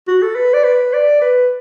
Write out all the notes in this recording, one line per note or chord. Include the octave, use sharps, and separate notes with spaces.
F#4
A4
B4
D5
B4
D5
B4